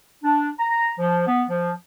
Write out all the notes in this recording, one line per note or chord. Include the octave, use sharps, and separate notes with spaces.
D4
A#5
F3
B3
F3